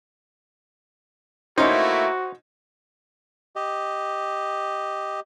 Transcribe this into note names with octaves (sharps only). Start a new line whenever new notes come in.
A3 A#3 C#4 D#4 E4 F#4 C5
G4 D#5